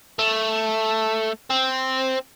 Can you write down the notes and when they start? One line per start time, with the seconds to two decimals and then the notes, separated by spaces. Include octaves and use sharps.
0.19 A3
1.50 C4